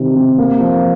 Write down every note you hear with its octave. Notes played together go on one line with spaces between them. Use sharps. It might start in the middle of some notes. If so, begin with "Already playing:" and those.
Already playing: C3 D#3 G3
C3
A#3
F3